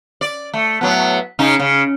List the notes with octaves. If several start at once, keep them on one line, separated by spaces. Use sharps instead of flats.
D5
A3
A2 F#3 B3
C#3 C#4 D#4
C#3